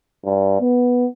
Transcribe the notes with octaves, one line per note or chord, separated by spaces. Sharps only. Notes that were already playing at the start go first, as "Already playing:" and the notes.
G2
B3